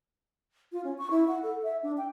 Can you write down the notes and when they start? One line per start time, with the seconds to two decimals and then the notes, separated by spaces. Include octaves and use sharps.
0.72 F4
0.84 C#4
0.98 C#6
1.11 E4
1.28 F#5
1.43 A4
1.63 E5
1.83 D4
1.98 G5